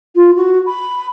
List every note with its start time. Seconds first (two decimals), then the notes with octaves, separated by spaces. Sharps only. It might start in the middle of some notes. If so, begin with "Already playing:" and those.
0.15 F4
0.36 F#4
0.66 B5